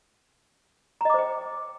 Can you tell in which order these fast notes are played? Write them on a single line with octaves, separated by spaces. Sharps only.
A#5 D#5 D6 C5 G5